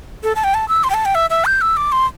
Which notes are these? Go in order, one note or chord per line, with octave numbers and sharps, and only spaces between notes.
A4
A5
G5
A5
E6
C6
G5
A5
G5
E5
E5
G6
E6
D6
C6